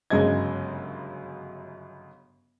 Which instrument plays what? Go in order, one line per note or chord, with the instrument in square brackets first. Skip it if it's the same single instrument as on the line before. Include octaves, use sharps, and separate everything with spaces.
[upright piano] G1 F#2 C#3 G#3 D#5 G#6